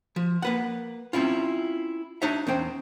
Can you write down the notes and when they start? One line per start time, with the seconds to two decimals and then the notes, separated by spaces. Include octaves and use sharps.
0.16 F3
0.42 A#3 B4 F#5
1.13 C4 C#4 E4 F4
2.22 D4 D#4 C#5 E5
2.47 E2 C#4 C5 G5